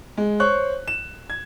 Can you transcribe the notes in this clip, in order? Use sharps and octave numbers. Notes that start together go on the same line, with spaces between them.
G#3
C5 C#5 C#6 F#6
E7
G#6